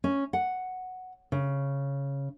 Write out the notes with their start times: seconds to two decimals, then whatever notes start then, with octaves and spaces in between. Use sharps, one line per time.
0.04 C#4
0.33 F#5
1.32 C#3